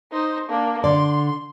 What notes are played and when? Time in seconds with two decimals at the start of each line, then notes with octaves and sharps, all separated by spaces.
0.12 D#4 C5
0.49 A#3 D4
0.84 D3 D5 C6